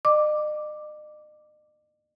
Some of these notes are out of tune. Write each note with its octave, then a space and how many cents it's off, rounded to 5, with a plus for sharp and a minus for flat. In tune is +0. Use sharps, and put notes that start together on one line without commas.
D#5 -45 D6 +0